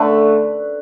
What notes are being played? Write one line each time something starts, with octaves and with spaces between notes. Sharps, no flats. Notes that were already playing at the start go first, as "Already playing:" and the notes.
Already playing: D3 A3 B4